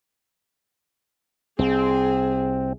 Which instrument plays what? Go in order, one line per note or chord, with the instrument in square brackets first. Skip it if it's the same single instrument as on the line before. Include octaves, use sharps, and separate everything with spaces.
[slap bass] C2 [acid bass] C4 [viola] G#4